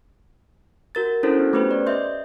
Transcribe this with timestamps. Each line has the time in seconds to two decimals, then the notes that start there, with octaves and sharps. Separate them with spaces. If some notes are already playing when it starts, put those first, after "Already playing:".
0.95 F#4 A#4 A6
1.23 C#4 D4 E4 F#4 A4 C5
1.39 B3
1.53 A3 B3 C#4 G4 B4 C5
1.71 D5
1.86 D#5 E5 C6 G6